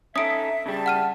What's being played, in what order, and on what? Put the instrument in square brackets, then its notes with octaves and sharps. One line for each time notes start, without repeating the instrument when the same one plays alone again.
[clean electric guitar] C#4 D#4 A4 [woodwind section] E5 [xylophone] D#6 D7
[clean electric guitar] C#3 G3 [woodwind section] G#4 A5
[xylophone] F#5 F6 D#7